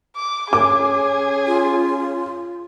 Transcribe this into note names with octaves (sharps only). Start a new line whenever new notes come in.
D6
C#4 G#4 D6
F4